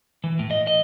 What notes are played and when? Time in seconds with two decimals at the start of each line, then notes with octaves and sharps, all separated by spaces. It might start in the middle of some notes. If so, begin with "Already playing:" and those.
0.24 E3
0.39 A2
0.51 D#5
0.67 D#5